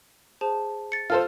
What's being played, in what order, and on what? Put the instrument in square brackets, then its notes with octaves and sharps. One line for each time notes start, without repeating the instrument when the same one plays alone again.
[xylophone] G#4 C5 A5
A6 C#7
[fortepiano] F4 A4 C5 [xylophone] F6